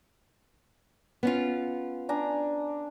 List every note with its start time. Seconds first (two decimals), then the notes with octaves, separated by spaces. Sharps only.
1.23 B3 C#4 F4
2.09 D4 G#5 A#5